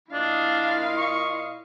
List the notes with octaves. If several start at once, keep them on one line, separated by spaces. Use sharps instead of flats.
A#2 D4 E4 F4 D#5 F5
C#6